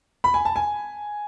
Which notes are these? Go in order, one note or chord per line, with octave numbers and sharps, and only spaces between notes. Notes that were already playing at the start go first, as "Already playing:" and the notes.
B5
G#5
A5
G#5